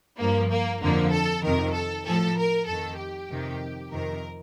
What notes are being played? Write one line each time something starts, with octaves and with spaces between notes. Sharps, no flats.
G2 F3 A#3
A#3
F2 D3 F3 A#3
A4
F2 C3 D#3 A#4
A4
A2 F3 A4
A#4
F2 A4
D#3
G4
F2 C3 D#3
F2 C3 D#3 A#4